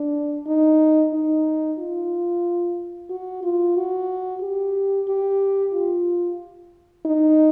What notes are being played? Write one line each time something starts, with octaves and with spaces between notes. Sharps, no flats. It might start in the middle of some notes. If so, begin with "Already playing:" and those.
Already playing: D4
D#4
D#4
F4
F#4
F4
F#4
G4
G4
F4
D#4